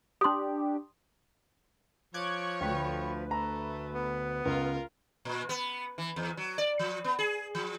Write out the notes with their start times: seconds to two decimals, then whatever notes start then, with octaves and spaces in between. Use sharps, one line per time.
0.21 D4 G4 C6 D#6
2.14 F3 C#5 C#6 D6 F#6 G#6
2.61 D2 B4 G5
3.31 A3 A#5
3.94 B3
4.45 C#2 F4 A#4
5.25 A#2
5.49 B3
5.98 E3
6.16 E2
6.37 F#3
6.58 D5
6.79 F3
7.04 B3
7.19 G#4
7.55 F3